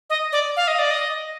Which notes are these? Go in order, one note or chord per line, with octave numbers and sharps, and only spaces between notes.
D#5
D5
F5
D#5
D5
D#5